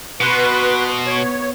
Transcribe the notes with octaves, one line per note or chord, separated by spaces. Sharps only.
B2 F#4 B4 C6
B3 C#5